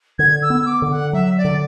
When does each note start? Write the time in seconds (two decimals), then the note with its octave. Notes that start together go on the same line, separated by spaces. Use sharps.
0.18 D3 G#6
0.42 E6
0.50 B3
0.66 D6
0.82 D3
0.90 F#5
1.13 F#3 E5
1.37 D5
1.45 D3